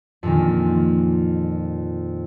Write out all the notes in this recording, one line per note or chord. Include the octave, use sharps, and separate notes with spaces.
F2 A#2 D#3